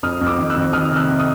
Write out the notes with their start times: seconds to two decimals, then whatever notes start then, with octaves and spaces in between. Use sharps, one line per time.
0.03 F2 D#6 F6
0.21 F2
0.26 D6 E6
0.38 D#3
0.50 E6 F#6
0.56 F2
0.73 D#3 D#6 F6
0.91 C3
0.96 E6 F#6
1.08 C3
1.20 D#6